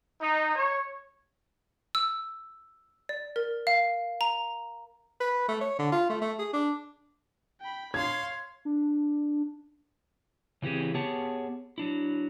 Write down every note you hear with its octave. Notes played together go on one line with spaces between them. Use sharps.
D#4
C#5
E6
D5
A#4
F5
A#5
B4
A3
C#5
D3
F4
A3
A3
G#4
D4
G5 B5
C#5 F5 C6 G#6
D4
C#3 E3 C4 G4 G#4
B3 G4 G#4 C#5 A5
F#3 D4 E4